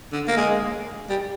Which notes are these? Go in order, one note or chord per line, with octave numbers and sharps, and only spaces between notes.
D3
A#3
G#3
G3